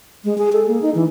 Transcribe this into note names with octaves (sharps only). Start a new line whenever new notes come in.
G#3
G#4
A4
A#3
D#4
E3